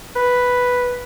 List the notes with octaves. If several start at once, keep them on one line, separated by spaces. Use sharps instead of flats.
B4